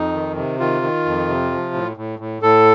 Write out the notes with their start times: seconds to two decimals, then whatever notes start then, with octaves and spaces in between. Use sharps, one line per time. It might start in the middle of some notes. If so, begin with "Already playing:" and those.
Already playing: F2 D#4
0.14 D#3
0.37 C3
0.60 D#3 F4
0.82 D#3
1.05 F2
1.28 C3
1.51 F3
1.74 A2
1.97 A2
2.19 A2
2.42 A2 A4